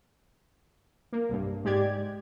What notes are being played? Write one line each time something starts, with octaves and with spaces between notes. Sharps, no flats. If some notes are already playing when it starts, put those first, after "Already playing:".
A#3
C2 G2
G#2 G#3 G4 D5 G#6